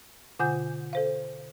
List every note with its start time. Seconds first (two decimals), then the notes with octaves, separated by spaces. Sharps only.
0.39 B2 D3 F4 F#5 G#5 G6
0.93 A4 C5 F5